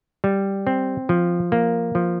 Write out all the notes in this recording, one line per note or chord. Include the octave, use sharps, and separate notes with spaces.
G3
C4
F3
A#3
F3